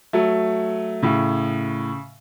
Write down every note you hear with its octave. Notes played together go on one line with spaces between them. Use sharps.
F#3 A3
A2 C#3